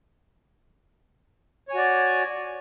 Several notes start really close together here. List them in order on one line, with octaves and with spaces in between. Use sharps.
C#5 G#5 F#4 D5